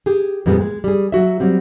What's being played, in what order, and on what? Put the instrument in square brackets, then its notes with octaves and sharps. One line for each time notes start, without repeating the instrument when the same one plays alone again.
[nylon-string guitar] G4 G#4
F2 A#2 G3 G#3 B3
G#3
G3 G#4
F#3 F#4 E5
F#3 G3 C4